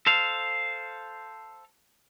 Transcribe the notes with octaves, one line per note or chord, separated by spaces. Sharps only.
A4 C5 F5